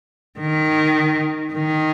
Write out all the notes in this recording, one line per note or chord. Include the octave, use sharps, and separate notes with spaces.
D#3
D#3